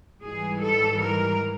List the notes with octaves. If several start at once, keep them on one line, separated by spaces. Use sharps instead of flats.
G#2 E3 G3 G#4
A4
A#4